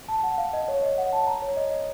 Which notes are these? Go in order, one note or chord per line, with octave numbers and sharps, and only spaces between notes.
A5
F#5
F5
D#5
C#5
D#5
F#5
A5
A#5
C#5
D#5
D#5